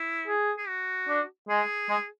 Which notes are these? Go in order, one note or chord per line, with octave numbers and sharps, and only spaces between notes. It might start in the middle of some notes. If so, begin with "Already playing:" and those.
Already playing: E4
G#4
G#4
F#4
D4
G#3 G#4
G#3